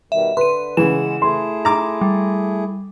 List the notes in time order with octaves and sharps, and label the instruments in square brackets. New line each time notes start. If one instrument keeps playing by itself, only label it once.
[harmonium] B2 D#3 G3 [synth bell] E5
[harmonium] D3 [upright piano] B4 [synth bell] C6 D#7
[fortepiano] C#3 E3 [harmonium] G#3 F#5 [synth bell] E7
[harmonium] A3 E4 G#4 [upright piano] C6
[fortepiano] A#5 D6
[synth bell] G3